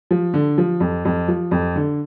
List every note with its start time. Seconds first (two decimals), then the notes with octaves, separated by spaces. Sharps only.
0.11 F3
0.34 D3
0.58 F3
0.80 F2
1.05 F2
1.28 F3
1.51 F2
1.76 D3